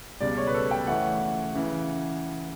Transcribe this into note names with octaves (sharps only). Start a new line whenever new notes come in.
C#2 B2 G3 D5
C#5
B4
A4
G5
C#3 E3 A3 C#4 F#5
C#3 E3